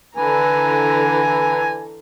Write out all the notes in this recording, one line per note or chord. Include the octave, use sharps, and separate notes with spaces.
D3 E3 B4 G#5 A#5